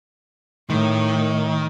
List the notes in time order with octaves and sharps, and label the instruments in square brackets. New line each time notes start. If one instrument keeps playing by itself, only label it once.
[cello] A2 [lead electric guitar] D#3